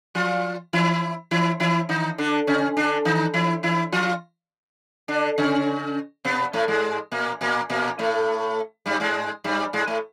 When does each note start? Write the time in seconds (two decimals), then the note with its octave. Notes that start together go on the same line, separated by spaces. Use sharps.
0.15 F3 F4
0.73 E3 E4
1.31 E3 E4
1.60 E3 E4
1.89 D#3 D#4
2.18 D3 D4
2.47 C#3 C#4
2.77 D3 D4
3.05 D#3 D#4
3.34 E3 E4
3.63 E3 E4
3.92 F3 F4
5.08 D3 D4
5.38 C#3 C#4
6.25 B2 B3
6.53 A2 A3
6.68 G#2 G#3
7.12 A#2 A#3
7.41 A#2 A#3
7.70 A#2 A#3
7.99 A2 A3
8.86 G2 G3
9.00 G#2 G#3
9.44 G2 G3
9.73 G#2 G#3
9.87 A2 A3